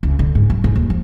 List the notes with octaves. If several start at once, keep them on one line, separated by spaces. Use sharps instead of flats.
C#2
D3
G#2
F#3
G#2
D#2
F3